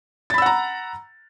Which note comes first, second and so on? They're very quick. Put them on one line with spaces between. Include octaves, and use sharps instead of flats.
A6 B5 E6 F#5 A#5